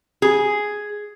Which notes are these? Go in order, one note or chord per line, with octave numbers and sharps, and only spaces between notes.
G#4